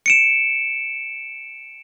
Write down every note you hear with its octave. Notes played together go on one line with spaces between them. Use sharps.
C#7 D7 E7